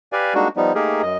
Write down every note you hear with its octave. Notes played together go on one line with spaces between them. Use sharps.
G4 B4 D5 F5 G#5
G3 G#3 A#3 D4 D#4 F#4
F3 G3 B3 D#4
A3 A#3 D#4 G4 G#4 A#4
F#2 D#5